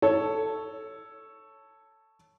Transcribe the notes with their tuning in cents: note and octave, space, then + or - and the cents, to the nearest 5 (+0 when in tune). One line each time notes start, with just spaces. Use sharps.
A4 +0 C#5 +0